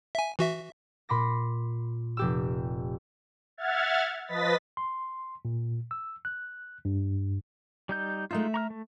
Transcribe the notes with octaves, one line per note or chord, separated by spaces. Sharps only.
E5 G#5
E3 F#4 E5
A#2 B5 C6 D6 A#6
F1 G4 E6
E5 F#5 F6 G#6 A6
F3 B4 D#5 A6 B6
C6
A#2
E6
F#6
G2
G3 D#4 G6
G#3 A3 D#4 F4 E5
A#5 C#6 F6
A3